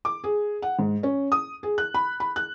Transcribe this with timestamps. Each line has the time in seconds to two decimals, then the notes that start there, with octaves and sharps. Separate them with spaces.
0.05 D6
0.24 G#4
0.62 F#5
0.79 G#2
1.03 C#4
1.32 D#6
1.63 G#4
1.78 F#6
1.94 B5
2.20 B5
2.36 F#6